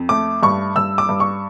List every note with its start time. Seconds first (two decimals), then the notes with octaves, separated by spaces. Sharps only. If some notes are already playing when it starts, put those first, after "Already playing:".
Already playing: F2
0.09 A3 D6
0.43 G2 C#6
0.76 G2 E6
0.98 D6
1.09 G2
1.20 C#6